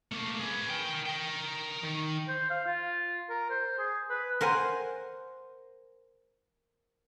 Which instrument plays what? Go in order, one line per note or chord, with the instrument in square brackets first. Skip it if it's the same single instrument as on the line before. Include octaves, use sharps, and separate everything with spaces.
[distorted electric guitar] A3 A#3
G#4 B4
A#4 G5
A#4 G5
D#3
[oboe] C5
F5
F4
A#4
C5
G#4
B4
[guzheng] A#4 C5 F#5 G#5